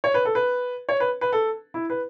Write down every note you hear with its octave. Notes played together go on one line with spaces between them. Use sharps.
C#5
B4
A4
B4
C#5
B4
B4
A4
E4
B4